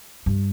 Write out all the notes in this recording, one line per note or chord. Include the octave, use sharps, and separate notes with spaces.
G2